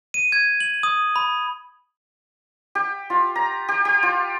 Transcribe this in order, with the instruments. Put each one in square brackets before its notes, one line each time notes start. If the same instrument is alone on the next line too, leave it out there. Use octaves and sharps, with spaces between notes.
[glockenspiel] D#7
G#6
F#7
D#6
B5
[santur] G4
F4
A#5
G4
G4
F4